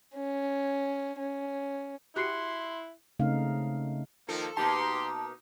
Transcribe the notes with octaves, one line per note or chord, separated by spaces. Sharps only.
C#4
C#4
E4 F#4 G4 C6 F#6 C7 C#7
C#3 A3 C4 D#4 F5
D#3 F3 A#3 A4
B2 A#3 D#4 G4 A5 C6